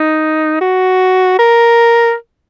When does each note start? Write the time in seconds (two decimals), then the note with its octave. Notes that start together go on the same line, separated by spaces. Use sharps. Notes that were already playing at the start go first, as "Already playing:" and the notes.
Already playing: D#4
0.61 F#4
1.39 A#4